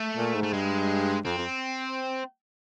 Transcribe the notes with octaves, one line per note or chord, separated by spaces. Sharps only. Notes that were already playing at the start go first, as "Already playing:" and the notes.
Already playing: A3
A#2
G#2
A3
G2 G#3
F2 C4
F2